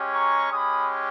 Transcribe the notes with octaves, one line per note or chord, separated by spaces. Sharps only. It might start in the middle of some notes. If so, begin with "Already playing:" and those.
Already playing: G#3 C#4 G4
A#5 C#6
G#3 C#4 G4 B5 D#6